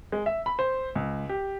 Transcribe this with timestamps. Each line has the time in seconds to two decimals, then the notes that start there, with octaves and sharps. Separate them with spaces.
0.12 G#3
0.26 E5
0.46 B5
0.59 C5
0.95 C#2
1.29 G4